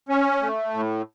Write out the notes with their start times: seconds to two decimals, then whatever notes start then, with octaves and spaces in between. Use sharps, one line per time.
0.09 C#4
0.42 A3
0.74 A2